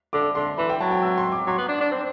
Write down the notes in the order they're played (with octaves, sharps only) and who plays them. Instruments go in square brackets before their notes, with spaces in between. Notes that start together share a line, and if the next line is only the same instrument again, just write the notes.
[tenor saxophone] D3 [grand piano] D6
[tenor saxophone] D3 [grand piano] C6
[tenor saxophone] E3 [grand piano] B5
[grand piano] G5
[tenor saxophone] F#3 [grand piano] A5
[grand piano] G5
E6
C6
D6
[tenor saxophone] F#3 [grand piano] C6
[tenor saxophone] B3
D4
D4
C4